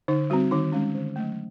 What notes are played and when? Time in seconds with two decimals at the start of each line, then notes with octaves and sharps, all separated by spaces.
0.08 D3 D#4
0.30 G3 C4 F#4
0.51 D#3 D#4
0.72 G#3 C#4
0.95 D3
1.16 F#3 A3